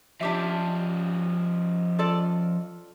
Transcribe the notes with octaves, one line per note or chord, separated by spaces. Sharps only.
F3 C#4 D4 G4 E5
F4 A4 D5